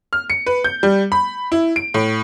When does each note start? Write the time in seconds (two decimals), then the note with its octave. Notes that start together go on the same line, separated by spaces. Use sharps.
0.13 F6
0.30 C#7
0.46 B4
0.64 G6
0.83 G3
1.12 B5
1.52 E4
1.76 D7
1.94 A2